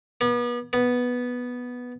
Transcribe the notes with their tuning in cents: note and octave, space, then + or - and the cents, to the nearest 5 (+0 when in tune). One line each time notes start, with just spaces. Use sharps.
B3 -35
B3 -5